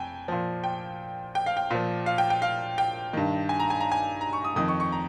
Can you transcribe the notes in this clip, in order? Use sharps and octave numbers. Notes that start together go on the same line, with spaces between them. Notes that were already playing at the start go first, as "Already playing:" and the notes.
Already playing: F2 G5 G#5
A#2 F3
G5
G5
F5
G5
A#2 F3
F5
G5
G5
F5
G5
G2 D#3
G#5
A#5
G#5
A#5
G#5
A#5
C#6
D#6
F2 D#3 D#6
C#6
C#6
A#5